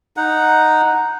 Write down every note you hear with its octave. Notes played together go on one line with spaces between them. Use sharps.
D#4 F#5